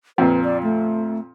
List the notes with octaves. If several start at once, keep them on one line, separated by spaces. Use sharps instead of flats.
F2 A#2 B4
D5
A3